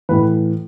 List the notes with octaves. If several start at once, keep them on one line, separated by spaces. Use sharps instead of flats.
A2 E3 B4